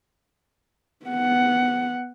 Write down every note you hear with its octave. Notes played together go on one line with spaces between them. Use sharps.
B3 F#5